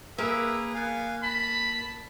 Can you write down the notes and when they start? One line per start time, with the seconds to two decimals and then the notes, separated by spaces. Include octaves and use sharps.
0.18 A#3 G#4 A#4 B4 E5
0.74 B3 F5 G#5
1.23 A5 B5